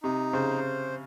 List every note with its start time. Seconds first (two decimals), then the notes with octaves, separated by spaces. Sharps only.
0.03 C3 D#4
0.33 C#3 C5